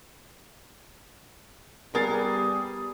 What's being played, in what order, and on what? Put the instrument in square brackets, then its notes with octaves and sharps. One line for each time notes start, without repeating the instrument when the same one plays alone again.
[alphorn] G3 [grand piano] B3 A6 C7 [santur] G#4 [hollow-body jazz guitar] A#4